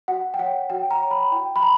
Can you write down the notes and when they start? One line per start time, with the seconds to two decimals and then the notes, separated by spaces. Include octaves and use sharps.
0.08 F#4 F#5
0.34 G5
0.39 C#5 F#5
0.70 F#4 G5
0.91 A#5
1.01 C#5
1.11 B5
1.32 E4 G5
1.56 B5
1.62 A#5